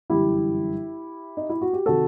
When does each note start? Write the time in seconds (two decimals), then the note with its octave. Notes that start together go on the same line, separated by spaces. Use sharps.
0.10 G1 F#2 E3 G3 E4 G4
1.37 D#4
1.49 E4
1.61 F#4
1.73 G4
1.86 C3 D#3 F#4 A4